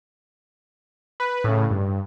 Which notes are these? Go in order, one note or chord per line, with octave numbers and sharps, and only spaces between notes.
B4
A2 C#3
G2